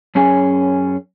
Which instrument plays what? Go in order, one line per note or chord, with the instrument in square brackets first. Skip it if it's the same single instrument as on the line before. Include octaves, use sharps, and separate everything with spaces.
[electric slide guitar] F#2 C#4 G#4 G#5